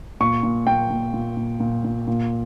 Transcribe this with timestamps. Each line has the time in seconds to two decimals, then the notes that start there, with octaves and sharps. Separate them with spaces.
0.20 A#2 C#6
0.43 A#2
0.67 A#2 G5
0.90 A#2
1.14 A#2
1.37 A#2
1.60 A#2
1.84 A#2
2.08 A#2